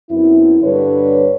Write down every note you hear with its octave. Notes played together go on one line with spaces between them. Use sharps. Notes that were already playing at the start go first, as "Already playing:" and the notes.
F#2 B3 C4 E4
G2 D3 G3 B4 C#5